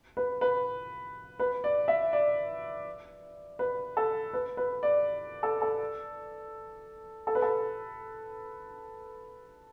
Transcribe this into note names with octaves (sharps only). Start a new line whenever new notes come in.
B4
B4
B4
D5
E5
D5
B4
A4
B4
B4
D5
A4
A4
A4
B4
A4